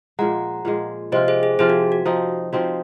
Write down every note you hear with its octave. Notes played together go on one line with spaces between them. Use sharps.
A#2 F3 G#3 F#5 A#5
A#2 F3 G#3
C3 F3 C4 F4 C5 D#5
G#4 C5
G#4
C3 F3 C4 F4 G#4
F#4
F#4
F3 C4 D#4
F3 C4 D#4 F#4